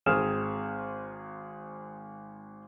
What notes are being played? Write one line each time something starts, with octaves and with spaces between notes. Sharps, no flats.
G#1 C4 G#4 D#6 F6 E7